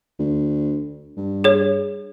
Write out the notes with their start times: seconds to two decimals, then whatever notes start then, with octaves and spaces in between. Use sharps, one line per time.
0.19 D2
1.17 G2
1.44 G#4 C#5